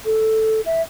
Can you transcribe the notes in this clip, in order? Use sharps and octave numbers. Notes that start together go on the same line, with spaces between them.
A4
E5